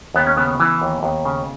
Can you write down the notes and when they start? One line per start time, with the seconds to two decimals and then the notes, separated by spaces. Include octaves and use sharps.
0.14 D#2 B3
0.27 C#4
0.37 C#3 B3
0.60 E3
0.82 D#2
1.03 D#2
1.25 C#3